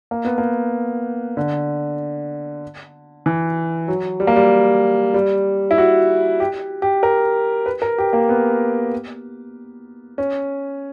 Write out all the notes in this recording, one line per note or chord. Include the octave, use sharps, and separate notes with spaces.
A#3
B3
A#3
D3
E3
F#3
G3
A#3
G3
G3
E4
F#4
G4
G4
A#4
B4
A#4
G4
A#3
B3
C#4